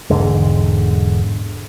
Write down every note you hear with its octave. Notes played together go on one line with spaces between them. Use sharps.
E1 G#2 D3 G#3